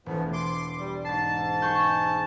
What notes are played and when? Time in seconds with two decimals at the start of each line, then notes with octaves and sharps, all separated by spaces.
0.06 E1 A2 F3 B3
0.33 C6 D6
0.79 G3
1.05 G#2 A5 A6 C7
1.62 G#4 C#6 G6